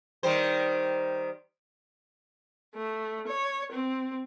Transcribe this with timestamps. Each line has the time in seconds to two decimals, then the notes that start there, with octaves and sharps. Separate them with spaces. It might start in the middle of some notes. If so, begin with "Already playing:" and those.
0.23 D#3 G3 C5
2.74 A3
3.27 C#5
3.72 C4